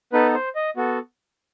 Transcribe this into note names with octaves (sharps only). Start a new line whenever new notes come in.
B3 D#4 A4 B4
C5
D#5
B3 F#4 A4